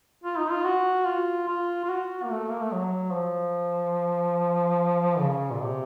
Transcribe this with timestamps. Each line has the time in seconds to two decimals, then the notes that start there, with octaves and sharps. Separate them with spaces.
0.24 F4
0.38 D#4
0.51 F4
0.65 F#4
1.07 F4
1.48 F4
1.84 F4
1.90 F#4
2.24 A#3
2.31 A3
2.50 A#3
2.61 A3
2.72 F#3
3.13 F3
5.20 C#3
5.51 A#2
5.62 C3